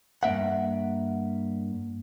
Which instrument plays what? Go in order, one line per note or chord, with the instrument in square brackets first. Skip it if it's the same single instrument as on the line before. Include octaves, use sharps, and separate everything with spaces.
[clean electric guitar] G2 A#3 E5 F#5